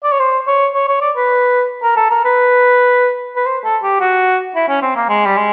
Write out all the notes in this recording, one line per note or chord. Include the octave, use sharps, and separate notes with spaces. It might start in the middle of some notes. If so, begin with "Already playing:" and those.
D5
C#5
C5
C#5
C#5
C#5
D5
B4
A#4
A4
A#4
B4
B4
C5
A4
G4
F#4
E4
C#4
C4
A#3
G#3
G3
G#3